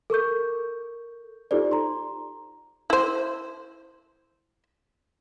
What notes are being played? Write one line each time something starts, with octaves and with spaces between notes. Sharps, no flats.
A4 A#4 C#6 G6
D#4 F4 G4 A4 C5 D5
A#5 C6
E4 C5